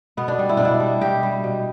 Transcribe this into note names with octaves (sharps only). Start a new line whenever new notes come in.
B2 B3
D4
G3
E4
B2 D4
E4
G3
B2 G4
G3
B2